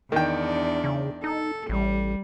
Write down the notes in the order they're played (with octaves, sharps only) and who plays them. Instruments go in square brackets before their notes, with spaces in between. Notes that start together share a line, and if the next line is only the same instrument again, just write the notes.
[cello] E2 D4 [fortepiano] D#3 G5
[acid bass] C#3
[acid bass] D#4 [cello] A4
[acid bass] A1 [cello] G3